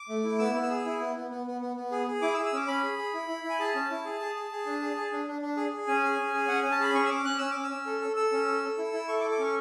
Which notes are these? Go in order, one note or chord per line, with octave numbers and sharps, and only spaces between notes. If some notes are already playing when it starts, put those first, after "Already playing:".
Already playing: D6
A3
E4
B3 E6
B3
E6
G#4
E4
B3
B3
B3
B3
B3
B3
G#4
G#4
E4 D6
E6
G#4
E6
C#4 D6
C#4 B5
G#4
G#4
E4
E4
E4
G#5
G#4 A5
C#4
E4
G#4
G#4
G#4
G#4
D4
G#4
G#4
D4
D4
D4
G#4
G#4
C#4 G#5
G#4
C#4
G#4
C#4 F#5
G#5
C#4
A5
G#4 B5
C#4 C#6
E6
C#4 D6
C#4 F#6
C#4 E6
C#4 D6
E6
C#4
A4
A4
A4 E6
C#4
A4
A4
E4
E4
A4 C#6
D6
A4
D6
C#4 C#6